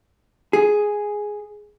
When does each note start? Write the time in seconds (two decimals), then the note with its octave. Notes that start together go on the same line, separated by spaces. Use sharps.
0.53 G#4